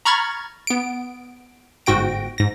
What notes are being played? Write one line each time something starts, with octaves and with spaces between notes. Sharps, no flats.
A#5 B5 C#6 F6 G#6 A6
B3 D7
G1 G#2 F#4 G5 A#6 D7
G#2 A#6